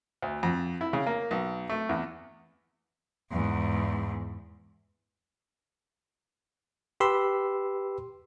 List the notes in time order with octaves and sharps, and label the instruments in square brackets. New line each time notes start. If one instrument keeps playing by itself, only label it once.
[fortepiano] D2
F2
E4
C#3
A#3
B1
A3
E2
[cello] E2 G#2
[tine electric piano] G4 B4 B5 C6 E6